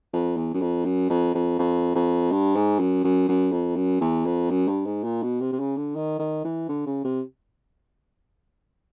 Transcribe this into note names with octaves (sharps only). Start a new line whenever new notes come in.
F2
E2
F#2
F2
F#2
F2
F2
F2
F2
G2
G#2
F#2
F#2
F#2
F2
F#2
E2
F2
F#2
G2
G#2
A#2
B2
C3
C3
C#3
D3
D#3
D#3
E3
D3
C#3
C3